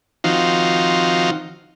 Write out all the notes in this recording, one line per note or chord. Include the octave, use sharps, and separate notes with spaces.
D#3 F3 C4 D#4 F#4 F5